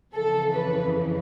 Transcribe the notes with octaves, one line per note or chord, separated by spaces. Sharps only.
F2 C#3 E3 A4
B4